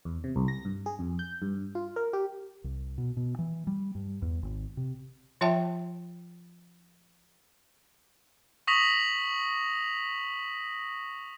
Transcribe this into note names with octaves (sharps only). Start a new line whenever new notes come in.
E2
C3
C2
A#6
G2
G#4
F2
G6
G2
F4
A#4
G4
C2
B2
B2
E3
G3
G2
E2
G#1
C3
F3 F4 C#5 E5 G5 A5
C#6 D#6 A#6 B6 F7 F#7